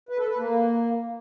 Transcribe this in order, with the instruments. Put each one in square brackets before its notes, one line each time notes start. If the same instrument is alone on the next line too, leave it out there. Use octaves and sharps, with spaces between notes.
[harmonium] B4
A4
B4
A#3